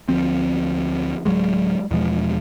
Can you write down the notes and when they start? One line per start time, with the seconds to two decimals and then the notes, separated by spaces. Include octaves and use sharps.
0.08 D2 F3 C4
1.25 D1 F2 F#3 G#3
1.91 E2 B2 F3 G#3